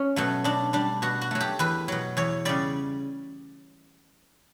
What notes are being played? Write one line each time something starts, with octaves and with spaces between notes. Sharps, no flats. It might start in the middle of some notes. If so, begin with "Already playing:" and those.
Already playing: C#4
B2 F#3 A3
B2 D4
G3 D4
B2 F#4
F#4
F#3 A3
G4
E2 B4
B2 F#3
E2 C#5
C#3 G3 D5